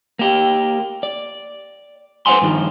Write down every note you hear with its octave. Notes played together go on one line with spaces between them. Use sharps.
A#3 G4
D5
B4 C5 D5 F#5 G#5 C6
G2 D#3 F3